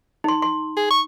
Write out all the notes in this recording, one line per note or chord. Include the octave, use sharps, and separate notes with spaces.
D#4 C6
C6
G#4
C#6